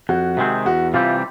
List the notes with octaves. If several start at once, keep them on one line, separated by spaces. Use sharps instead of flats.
F2 F#4
C3 D#3 G#3 C4
E2 F#4
C3 E3 G3 C4 F4